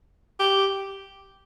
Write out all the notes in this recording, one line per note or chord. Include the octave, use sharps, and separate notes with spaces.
G4